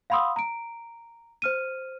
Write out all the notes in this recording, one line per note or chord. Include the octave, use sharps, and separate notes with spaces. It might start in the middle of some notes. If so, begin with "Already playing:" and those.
F5 F#5 B5 C6 D#6 E6
A#5 D7
C5 F6 D#7